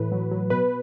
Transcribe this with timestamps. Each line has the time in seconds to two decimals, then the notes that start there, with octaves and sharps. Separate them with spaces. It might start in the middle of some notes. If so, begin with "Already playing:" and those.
Already playing: A2 E3 B4
0.12 F#3
0.31 F#3
0.50 B2 B4